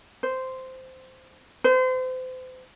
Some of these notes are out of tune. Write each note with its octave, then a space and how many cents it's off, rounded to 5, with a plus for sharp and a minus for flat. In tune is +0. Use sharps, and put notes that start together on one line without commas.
C5 -10
C5 -35